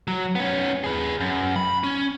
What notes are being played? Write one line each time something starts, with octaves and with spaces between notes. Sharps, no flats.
F#3
B3 C#4
G#4 B4
F#2
B5
C#4